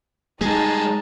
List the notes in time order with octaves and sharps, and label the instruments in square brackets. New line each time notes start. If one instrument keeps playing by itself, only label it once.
[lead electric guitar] G3 G#4 [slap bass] G#3 [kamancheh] D#4 A5